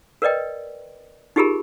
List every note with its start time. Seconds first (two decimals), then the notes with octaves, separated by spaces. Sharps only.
0.22 A#4 B4 D5 D#5 G5
1.36 D#4 F4 G4 G#4 A#4 B5